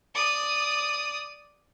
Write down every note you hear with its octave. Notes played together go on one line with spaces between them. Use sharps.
D5 D#6